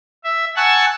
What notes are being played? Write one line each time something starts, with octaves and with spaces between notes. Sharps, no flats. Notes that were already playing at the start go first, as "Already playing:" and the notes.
E5
F#5 G#5 A5 C#6 E6 F#6